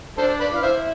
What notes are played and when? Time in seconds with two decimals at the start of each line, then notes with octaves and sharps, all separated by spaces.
0.17 D4 A4 C5
0.40 B4 D5
0.52 E4 F5
0.63 C5 E5